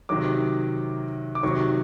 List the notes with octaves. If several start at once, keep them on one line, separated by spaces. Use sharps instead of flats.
C3 D#3 F#3 D6
D6
C3 D#3 F#3 C#6